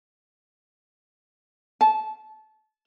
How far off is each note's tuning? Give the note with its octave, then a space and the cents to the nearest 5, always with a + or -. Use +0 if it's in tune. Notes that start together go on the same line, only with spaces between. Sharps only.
A5 -25